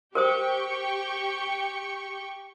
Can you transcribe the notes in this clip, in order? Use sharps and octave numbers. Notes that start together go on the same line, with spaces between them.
G4 A#4 C5 G5 C#6 D#6